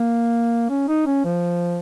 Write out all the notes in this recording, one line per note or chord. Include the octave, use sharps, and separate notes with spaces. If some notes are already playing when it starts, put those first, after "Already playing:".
Already playing: A#3
C#4
D#4
C#4
F3